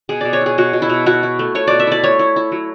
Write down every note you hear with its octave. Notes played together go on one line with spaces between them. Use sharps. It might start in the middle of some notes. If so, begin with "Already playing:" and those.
B2 G#4
B2 D5
C#5
E4 G#4
B2 F#4
B2
E4
B2
E4 F#4
E4
A3
A3 C#5
B2 D5
E5
E4 D5
A3 C#5
E4
E4
F#3